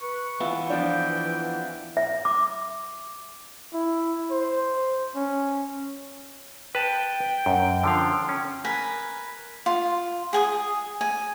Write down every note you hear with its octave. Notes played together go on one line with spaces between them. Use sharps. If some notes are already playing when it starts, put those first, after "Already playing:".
B4 C#6
E3 B3 E4 F4
F3 D4 G5
E5
D6
E4
C5
C#4
B4 G5 A5
F#2
D3 F3 F5
C#4
A#4 B4 G#5
F4
G#4 G#5 D#6
G#5